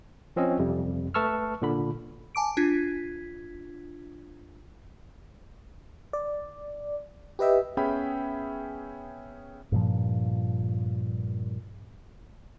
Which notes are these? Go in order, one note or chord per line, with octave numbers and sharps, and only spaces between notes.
F3 C4 C#4 D#5
F2 C3 G3
A3 B4 A5 C#6 E6 F6
A#2 D3 B5
G#5 A5 D6 D7
D4 F4 G#6 B6
D5
G4 B4 D#5 E5 G5
B3 C#4 G#4 E5 G5 B5
G2 A#2 F3